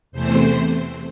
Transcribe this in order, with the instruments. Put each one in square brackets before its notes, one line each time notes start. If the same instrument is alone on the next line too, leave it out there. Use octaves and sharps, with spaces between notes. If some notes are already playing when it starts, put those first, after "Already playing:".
[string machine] E2 C3 E3 A3 C4 C5